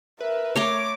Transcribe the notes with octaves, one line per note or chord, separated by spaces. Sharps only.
A#4 B4 E5
A3 C#5 A#5 C6 D6